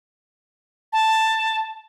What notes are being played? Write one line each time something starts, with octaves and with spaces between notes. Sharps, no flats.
A5